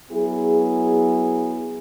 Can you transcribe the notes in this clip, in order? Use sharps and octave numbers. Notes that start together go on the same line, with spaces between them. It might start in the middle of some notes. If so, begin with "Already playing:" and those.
F#3 B3 E4 G#4